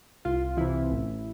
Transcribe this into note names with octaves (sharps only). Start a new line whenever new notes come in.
C2 F4
C3 E3 E4
A1